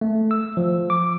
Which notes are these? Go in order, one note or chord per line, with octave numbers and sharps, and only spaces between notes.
A3
E6
F3
D6